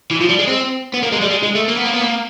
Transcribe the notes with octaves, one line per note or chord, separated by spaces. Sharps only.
E3
F3
G3
G#3
C4
B3
A#3
G#3
G3
G#3
G#3
A3
A#3
B3
A#3
B3
A#3